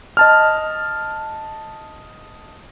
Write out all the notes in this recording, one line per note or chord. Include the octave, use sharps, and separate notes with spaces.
D#5 A5 F6